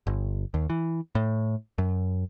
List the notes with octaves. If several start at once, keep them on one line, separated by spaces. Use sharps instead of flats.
G1
D#2
E3
A2
F#2